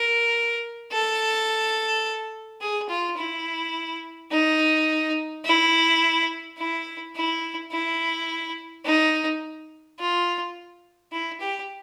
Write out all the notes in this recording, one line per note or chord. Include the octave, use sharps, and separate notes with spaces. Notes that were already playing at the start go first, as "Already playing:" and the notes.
Already playing: A#4
A4
G#4
F4
E4
D#4
E4
E4
E4
E4
D#4
F4
E4
G4